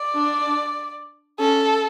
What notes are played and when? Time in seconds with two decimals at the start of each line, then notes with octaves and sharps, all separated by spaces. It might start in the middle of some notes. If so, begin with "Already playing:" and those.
Already playing: D5
0.15 D4
1.39 C#4 A4